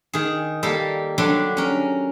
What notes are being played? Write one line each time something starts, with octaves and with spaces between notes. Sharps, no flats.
D#3 G#4
G3 A#3 A4
D3 F#3 G3 D4
C#4 A#4